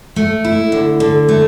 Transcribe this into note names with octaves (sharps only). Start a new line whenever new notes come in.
A3
E4
D3
D3
A3